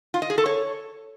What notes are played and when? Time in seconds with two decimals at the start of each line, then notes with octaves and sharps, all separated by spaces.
0.14 F4
0.22 D#5
0.30 G#4
0.38 A4
0.46 C#5